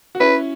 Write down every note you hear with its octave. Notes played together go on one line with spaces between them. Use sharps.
F#4
C#4 E4 B4